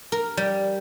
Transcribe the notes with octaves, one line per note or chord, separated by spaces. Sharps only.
A#4
G3